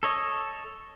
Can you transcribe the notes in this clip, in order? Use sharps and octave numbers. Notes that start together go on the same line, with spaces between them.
A4 C#5 D#5